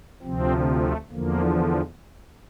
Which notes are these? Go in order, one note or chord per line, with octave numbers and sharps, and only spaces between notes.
D2 C3 F3 C4
A3
E2 D3 F3 A#3